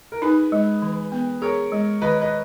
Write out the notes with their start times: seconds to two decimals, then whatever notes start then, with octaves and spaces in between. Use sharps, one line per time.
0.12 A#4
0.22 D#4 G#4 B4
0.52 G#3
0.82 E3
1.12 B3
1.42 G#4 A#4 C#5
1.72 G#3
2.02 D#3 B4 D#5
2.21 B4 D#5